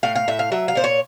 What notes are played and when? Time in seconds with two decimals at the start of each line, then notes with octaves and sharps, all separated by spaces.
0.03 A2 F5
0.15 F5
0.28 A2 E5
0.39 F5
0.52 F#3 E5
0.68 F5
0.75 A#2 C5
0.84 C#5